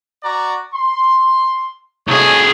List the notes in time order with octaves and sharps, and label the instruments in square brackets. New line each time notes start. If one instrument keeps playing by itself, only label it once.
[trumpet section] F#4 D5 A#5
C6
[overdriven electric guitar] C2 G#4 [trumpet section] A4 C#5 D#5